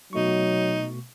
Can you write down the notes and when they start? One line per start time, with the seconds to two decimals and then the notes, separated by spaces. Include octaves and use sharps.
0.13 B2 F#3 A3 D#4 C#6